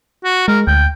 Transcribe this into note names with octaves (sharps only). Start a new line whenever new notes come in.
F#4
G#3 A#4
D2 G5